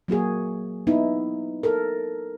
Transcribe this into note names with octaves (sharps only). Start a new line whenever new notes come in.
F#3 A#3 F#4 G#4
B3 D#4 E4
A4 A#4